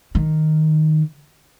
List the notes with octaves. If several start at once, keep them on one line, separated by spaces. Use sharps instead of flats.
D#3